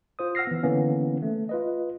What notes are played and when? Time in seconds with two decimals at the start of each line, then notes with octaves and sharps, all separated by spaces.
0.19 F4 C5 D#6
0.35 F#5 E6 F6 A#6 C7
0.47 E3 B3
0.63 D3 E3 A#3 B3 C#4
1.22 A3
1.49 F4 B4 D#5